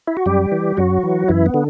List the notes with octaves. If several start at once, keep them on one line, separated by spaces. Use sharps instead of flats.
E4
F#4
F#2 G3 G4
E3
F#2 F#3 F#4
E3
F#2 E3 E4
B3
D3